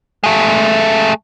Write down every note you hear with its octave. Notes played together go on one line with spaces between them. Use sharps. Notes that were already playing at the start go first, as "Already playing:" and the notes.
G#3 A3